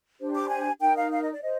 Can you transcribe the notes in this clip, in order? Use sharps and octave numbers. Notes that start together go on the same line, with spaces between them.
D4 G4 C5
D6
G#5
D#4 A#4 G5
F5
F5
D#5
D5
C5 D#5